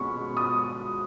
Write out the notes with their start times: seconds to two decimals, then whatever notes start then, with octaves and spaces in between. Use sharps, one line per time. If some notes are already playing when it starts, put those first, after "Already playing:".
Already playing: B2 G#3 C#4 B5 C#6
0.37 D#6